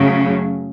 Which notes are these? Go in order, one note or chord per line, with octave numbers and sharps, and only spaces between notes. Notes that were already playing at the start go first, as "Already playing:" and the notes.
Already playing: F#2 C#3 F#3 A3